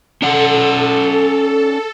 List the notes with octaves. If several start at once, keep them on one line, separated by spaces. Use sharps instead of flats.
C#4 A4 D5 F#5